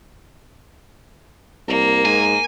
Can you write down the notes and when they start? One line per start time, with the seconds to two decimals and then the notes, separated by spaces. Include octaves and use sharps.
1.68 C2 A#3
2.05 G#2 G#5